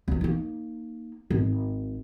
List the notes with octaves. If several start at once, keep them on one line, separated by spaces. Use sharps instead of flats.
C#2 D#3
A#3 D#4
G#1